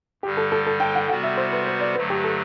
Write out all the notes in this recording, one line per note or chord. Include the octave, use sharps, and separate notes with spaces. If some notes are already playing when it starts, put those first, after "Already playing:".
G2 D3 G3 G4
A4
A4
A4
G5
F#5
C3 G3 B3 F#4 F#5
E5
C5
B4
C5
D5
G2 D3 F#3 A3 B4
G4
A4